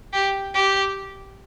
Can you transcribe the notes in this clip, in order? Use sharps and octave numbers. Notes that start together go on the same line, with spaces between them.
G4
G4